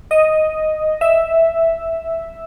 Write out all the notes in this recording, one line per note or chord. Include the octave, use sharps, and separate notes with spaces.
D#5
E5